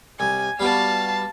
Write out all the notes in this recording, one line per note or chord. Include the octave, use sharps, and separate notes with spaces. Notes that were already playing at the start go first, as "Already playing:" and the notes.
C2 G#5
G3 B3 F#4 F5 A5